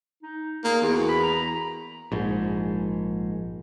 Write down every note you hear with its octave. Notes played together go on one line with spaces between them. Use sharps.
D#4
A#3 G#4
E2 F#4
B5
A#5
A#1 G#2